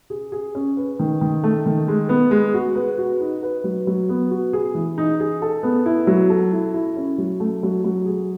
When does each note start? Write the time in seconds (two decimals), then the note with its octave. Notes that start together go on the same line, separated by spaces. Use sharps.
0.10 G#4
0.32 G#4
0.55 C#4
0.77 B4
1.00 D#3
1.21 D#3
1.44 A3
1.66 D#3
1.88 G#3
2.09 B3
2.31 G#3
2.54 F#4
2.75 B4
2.98 F#4
3.21 D#4
3.43 B4
3.64 F#3
3.87 F#3
4.09 B3
4.31 F#4
4.53 G#4
4.75 E3
4.98 D#4
5.20 G#4
5.42 A4
5.63 B3
5.86 E4
6.07 F#3
6.30 A4
6.53 E4
6.74 E4
6.97 C#4
7.18 F#3
7.40 A3
7.63 F#3
7.84 F#3
8.06 G#4